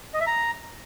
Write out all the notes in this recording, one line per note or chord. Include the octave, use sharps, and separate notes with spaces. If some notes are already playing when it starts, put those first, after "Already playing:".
D#5
E5
A#5